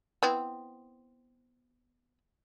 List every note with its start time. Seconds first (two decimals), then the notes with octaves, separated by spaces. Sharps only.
0.23 B3 C4 E4